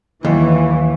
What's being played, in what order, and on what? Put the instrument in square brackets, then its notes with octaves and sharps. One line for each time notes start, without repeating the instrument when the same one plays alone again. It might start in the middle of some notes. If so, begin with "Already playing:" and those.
[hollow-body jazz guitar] D#2 [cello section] E3